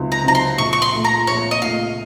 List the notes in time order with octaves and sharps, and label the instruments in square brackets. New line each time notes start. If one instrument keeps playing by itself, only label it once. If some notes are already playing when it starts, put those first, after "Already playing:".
Already playing: [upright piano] C#2 C3 F#3 C4 D#4
[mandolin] A#5
[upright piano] C3 F#3 C4 D#4 [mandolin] A#5
[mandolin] C6
[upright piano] A#1 [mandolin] C#6
[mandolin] C#6
C6
[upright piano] A#2 A3
[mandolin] A#5
[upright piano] A#1 [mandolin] C#5
[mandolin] D#5
[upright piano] A#2 A3 [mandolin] F5